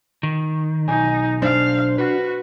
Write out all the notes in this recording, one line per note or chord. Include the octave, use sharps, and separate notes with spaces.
D#3
B1 D#4 G#5
D4 C5 F5
F#4 B4